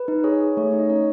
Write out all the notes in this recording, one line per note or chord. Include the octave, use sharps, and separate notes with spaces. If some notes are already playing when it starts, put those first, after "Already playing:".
Already playing: B4
D#4
G#4 C#5
G#4
A3 C#5
D#4
D#5
C#4 C#5